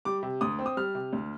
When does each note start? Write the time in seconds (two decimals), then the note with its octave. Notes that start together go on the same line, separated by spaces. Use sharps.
0.05 G3 D6
0.23 C3
0.41 D2 D#6
0.59 C4
0.66 D#6
0.77 G3 F6
0.95 C3
1.13 D2